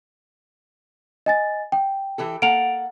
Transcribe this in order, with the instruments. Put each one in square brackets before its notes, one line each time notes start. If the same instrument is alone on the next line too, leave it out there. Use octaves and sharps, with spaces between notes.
[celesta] D#5 G#5 A6
G5
[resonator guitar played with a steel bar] E3 G4 A4
[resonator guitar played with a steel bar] A#3 A4 F#5 [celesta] D7 F7